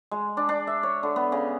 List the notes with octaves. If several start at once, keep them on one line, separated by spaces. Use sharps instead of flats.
G#3
D4
D4
E5
C#5
D3
B3
C#3